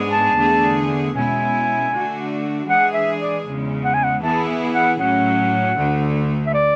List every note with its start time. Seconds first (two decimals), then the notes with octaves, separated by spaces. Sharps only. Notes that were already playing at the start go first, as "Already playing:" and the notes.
Already playing: G#2 G#3 B3 D4 G#4
0.11 A5
0.37 E2 D3 A3 D4 G#4
1.15 B2 G#3 C#4 E4 G#5
1.92 D3 A3 D4 F#4
2.68 E3 G#3 D4 G#4 F#5
2.94 E5
3.20 D5
3.46 E2 C#3 G#3
3.85 F#5
3.94 G#5
4.04 F#5
4.23 E3 B3 E4 G#4 A5
4.74 F#5
4.99 A2 F#3 C#4 F#5
5.77 D2 D3 A3
6.46 E5
6.54 D5